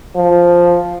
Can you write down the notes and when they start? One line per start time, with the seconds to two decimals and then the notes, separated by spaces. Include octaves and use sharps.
0.16 F3